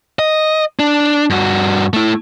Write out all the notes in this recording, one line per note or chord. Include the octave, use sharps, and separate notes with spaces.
D#5
D4
G2 F#4
A3 E4